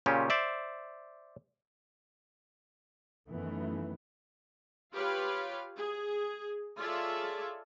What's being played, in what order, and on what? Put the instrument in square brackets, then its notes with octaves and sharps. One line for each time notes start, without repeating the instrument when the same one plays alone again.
[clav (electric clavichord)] A#2 C#3 C#4 F4 G4
C5 D5 E5
[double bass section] F#2 D#3 E3 A3 B3
[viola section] F4 G4 B4 C#5 F5 B5
G#4
F4 G#4 A4 C#5 D5 E5